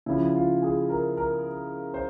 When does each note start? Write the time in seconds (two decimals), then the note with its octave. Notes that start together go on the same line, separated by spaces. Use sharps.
0.06 C#3 F3 E4
0.35 F4
0.62 G#4
0.90 A#4
1.17 A#4
1.94 C5